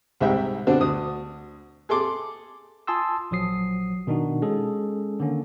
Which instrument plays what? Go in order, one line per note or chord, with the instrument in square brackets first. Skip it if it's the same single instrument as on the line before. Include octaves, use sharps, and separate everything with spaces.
[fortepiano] C2 G#2 G3 E5 G5
B2 D3 C4 D4
D2 D#6
G#4 A4 C6 D6
[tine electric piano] F4 G#5 A5 C6 D#6 E6
A#1 F3 F#3 D#6 C7
B2 D#3 D4 D#4 F#4
G#3 C#4 G#4 A4
D3 D#3 A#3 C#4